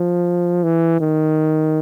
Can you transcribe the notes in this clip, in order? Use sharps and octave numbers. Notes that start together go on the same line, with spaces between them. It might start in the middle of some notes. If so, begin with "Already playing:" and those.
Already playing: F3
E3
D#3